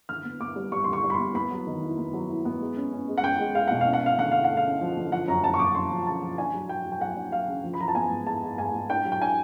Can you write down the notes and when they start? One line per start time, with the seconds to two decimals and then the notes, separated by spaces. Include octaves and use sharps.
0.09 D3 F6
0.25 B3
0.40 B3 D6
0.56 G3
0.72 G3 C#6
0.84 D3 C6
0.93 C#6
1.03 G3
1.10 B5
1.14 C6
1.19 B3
1.35 B3 B5
1.51 F#3
1.67 D#3
1.83 E4
1.98 B3
2.14 F#3
2.29 E4
2.45 B3
2.61 G#3
2.76 C#4
2.92 C#4
3.08 G#3
3.18 F#5
3.24 C#4 G5
3.40 G#3
3.55 G#3 F5
3.68 B2 F#5
3.81 F5
3.86 C#4
3.93 F#5
4.02 C#4 F5
4.18 D3 F#5
4.31 A3 F5
4.44 F#5
4.49 A3
4.57 F5
4.65 C#4
4.81 F3
4.97 D3
5.12 F3 F#5
5.28 F#2 A#5
5.44 F#2 A5
5.54 C#6
5.59 F#2 D6
5.75 F#2 C6
5.91 F3
6.07 C#3 A5
6.22 F3
6.38 D4 G#5
6.54 F#3
6.69 F#3 G5
6.85 F#3
6.92 G5
7.01 F#3 F#5
7.16 D4
7.32 F#3 F5
7.47 C#3
7.64 F3
7.74 B5
7.79 F3 A#5
7.88 A5
7.95 B3 G#5
8.11 G#2
8.27 G#3 A5
8.42 G#3
8.58 G#2 G#5
8.74 G#2
8.89 D4 G5
9.05 F#3
9.12 G5
9.21 D4 G#5